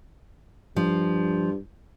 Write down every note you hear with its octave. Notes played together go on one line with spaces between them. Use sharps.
G2 F3